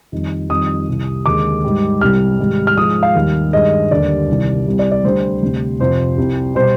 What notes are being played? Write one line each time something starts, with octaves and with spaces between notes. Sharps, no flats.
F2 D#3 G3
F2 D#3 G3 D#6
C2 C3 G3
D#2 D3 G#3 D6
G#2 G3
C2 C3 G3 F6
G#2 D#3 G3
F6
G#2 F3 G#3 D#6
F5
D#2 D#3 G3
G2 D#3 G#3 D#5
D#2 D3 G3 D5
C2 C3 D#3 G3
C2 C3 G3
D5
D5
D2 D3 G3 C5
D2 C3 G3
F2 C3 F3 C5
C2 C3 G3
B2 G3 C5